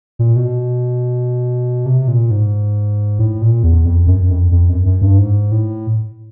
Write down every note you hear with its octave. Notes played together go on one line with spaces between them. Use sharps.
A#2
B2
C3
A#2
G#2
A2
A#2
E2
F2
F#2
F2
F2
F#2
F#2
G2
G#2
A2